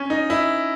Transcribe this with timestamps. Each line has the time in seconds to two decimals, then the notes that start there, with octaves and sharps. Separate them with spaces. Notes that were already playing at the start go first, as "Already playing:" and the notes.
Already playing: C#4
0.10 D#4
0.30 E4